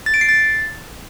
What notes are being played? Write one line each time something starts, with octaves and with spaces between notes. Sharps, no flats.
A6
D7
C7
A6